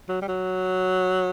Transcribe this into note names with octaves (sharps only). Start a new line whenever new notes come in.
F#3
G3
F#3